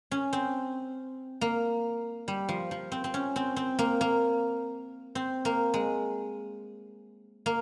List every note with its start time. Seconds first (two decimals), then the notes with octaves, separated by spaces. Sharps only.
0.11 C#4
0.33 C4
1.41 A#3
2.28 G3
2.49 F3
2.71 F3
2.92 C4
3.04 C4
3.14 C#4
3.36 C4
3.56 C4
3.79 A#3
4.01 A#3
5.15 C4
5.45 A#3
5.74 G#3
7.46 A#3